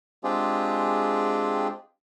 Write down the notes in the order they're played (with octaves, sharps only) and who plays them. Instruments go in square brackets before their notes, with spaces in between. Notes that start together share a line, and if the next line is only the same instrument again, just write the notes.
[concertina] G#3 C4 D4 F4 G4 G#4